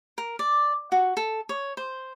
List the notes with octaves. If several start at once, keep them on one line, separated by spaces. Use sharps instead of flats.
A#4
D5
F#4
A4
C#5
C5